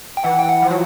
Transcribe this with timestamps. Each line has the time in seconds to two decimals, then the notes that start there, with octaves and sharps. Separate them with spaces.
0.17 G5
0.24 E3 F#5
0.39 G5
0.49 F#5
0.62 F3
0.70 F#3